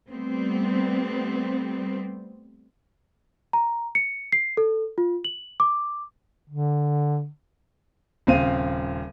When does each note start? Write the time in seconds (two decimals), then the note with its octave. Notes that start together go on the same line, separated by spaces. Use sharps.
0.11 G3 A3 B3 C4
3.53 A#5
3.95 C#7
4.32 C7
4.57 A4
4.98 F4
5.25 F#7
5.60 D6
6.49 D3
8.27 D#1 C#3 C4 F5 D#7